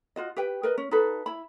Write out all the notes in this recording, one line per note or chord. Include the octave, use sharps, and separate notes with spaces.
F4 F#4 D#5
G4 B4 G5
A#4 B4 D#5
C#4
D#4 F#4 A4 B4
E4 B5